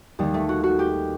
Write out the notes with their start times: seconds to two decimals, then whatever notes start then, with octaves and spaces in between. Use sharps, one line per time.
0.19 D#2 D#3 G3
0.34 A3
0.49 F#4
0.64 F#4
0.79 G4